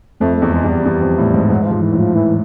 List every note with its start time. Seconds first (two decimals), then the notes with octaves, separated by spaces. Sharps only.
0.20 F2 A3
0.37 A3
0.42 E2
0.53 G#3
0.64 E2
0.69 G3
0.85 E2
1.02 F2
1.18 A2
1.34 G#2
1.50 G#2 F#3
1.62 E3
1.66 G#2 F3
1.82 E3
1.93 A2
1.99 F3
2.15 E3